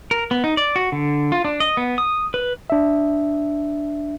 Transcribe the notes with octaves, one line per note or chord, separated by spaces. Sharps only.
A#4
B3
D#4
D5
F#4
D3
F4
D4
D#5
B3
D#6
B4
D4 E5